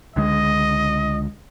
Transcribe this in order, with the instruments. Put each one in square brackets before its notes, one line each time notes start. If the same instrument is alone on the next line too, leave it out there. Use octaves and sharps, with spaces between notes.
[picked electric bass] C#2 D3 G#3 [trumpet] D#5